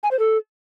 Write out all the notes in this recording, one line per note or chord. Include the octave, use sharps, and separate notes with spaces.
G#5
C5
A4